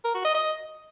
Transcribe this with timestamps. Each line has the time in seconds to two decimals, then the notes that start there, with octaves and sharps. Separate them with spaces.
0.04 A#4
0.14 F#4
0.24 D#5
0.34 D#5